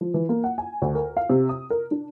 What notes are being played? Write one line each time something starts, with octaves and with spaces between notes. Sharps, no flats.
F3
E3
A#3
F#5
G#5
D2
A#4
F5
C3
D#6
A#4
D4